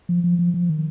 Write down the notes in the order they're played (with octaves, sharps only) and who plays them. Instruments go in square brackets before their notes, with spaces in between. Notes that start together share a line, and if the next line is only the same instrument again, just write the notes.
[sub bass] F3
F3
F3
F3
D#3